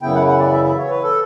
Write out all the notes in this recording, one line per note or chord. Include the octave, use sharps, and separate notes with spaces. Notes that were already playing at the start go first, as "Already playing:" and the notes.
F#2 C#3 E3 B3 E4 G5
F#5
F#5
D5
E5
E5
C#5
B4
A4